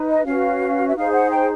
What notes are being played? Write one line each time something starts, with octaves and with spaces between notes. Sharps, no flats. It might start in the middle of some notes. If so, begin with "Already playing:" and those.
Already playing: D#4 B4
D#5
C#4 F#4 B4 F5
E5
D#4 G#4 C5 F5
F#5
G5